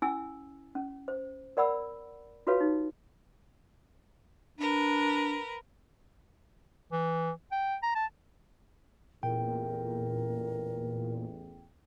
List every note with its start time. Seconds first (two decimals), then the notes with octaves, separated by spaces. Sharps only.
0.02 C#4 E4 G#5 E6
0.75 C#4
1.08 C5
1.57 A#4 D5 F#5 B5 E6
2.47 F4 F#4 A4 B4 C#5 F5
2.60 D#4
4.59 D4 A#4 B4
6.92 E3
7.52 G5
7.83 A#5
7.95 A5
9.23 A1 E2 A#2 A#4 G5